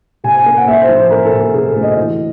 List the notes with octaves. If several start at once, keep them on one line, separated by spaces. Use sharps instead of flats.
C3 G#5
G#5
A#3
F#5
A#3 E5
C5
F3
C5
A#3 A#4
A4
C3
A4
C3 G#4
A4
D2
D#5
E3